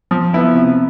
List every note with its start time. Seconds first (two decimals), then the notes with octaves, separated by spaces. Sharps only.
0.11 F3
0.33 B3 E4 B4
0.55 C3